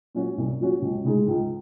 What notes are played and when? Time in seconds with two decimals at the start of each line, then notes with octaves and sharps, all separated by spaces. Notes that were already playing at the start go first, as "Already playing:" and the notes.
0.15 A#2 F#3 C#4 F#4
0.38 C2
0.60 A#2 F#3 C#4 F#4
0.82 C#2
1.05 C#3 G#3 D#4 G#4
1.27 C#2